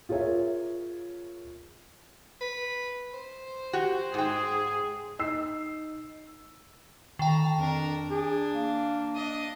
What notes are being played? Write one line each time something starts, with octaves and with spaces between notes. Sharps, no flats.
F4 G#4 A#4 C#5 E5
B4
C5
F#4 G4
G#2 G#4 G5
D#4 E6 C7
D3 D#3 G5 A5 A#5
F2 D4 A#4
D4 G#4
A#3
D4 D#5